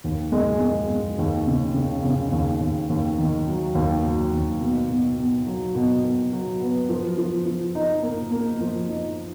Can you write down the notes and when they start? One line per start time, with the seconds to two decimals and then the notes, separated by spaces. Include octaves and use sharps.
0.04 D#2
0.32 G#3
0.61 G#3
0.90 G#3
1.18 D#2
1.47 C#3
1.75 C#3
2.04 C#3
2.32 D#2
2.61 D#2
2.90 D#2
3.18 D#3
3.46 F#3
3.75 D#2
4.03 F#3
4.32 D#2
4.61 B2
4.89 B2
5.18 B2
5.47 F#3
5.75 B2
6.04 B2
6.32 F#3
6.61 B3
6.89 F3
7.18 F3
7.46 F3
7.75 D#4
8.02 A#3
8.31 A#3
8.60 F3
8.88 D#4